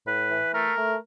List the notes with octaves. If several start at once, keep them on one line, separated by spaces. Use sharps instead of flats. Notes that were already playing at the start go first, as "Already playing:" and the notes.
A2 B4
E3
A3 A#4
A3